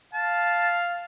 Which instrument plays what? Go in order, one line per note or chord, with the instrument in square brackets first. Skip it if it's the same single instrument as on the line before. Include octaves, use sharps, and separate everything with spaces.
[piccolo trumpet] F5 [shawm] A5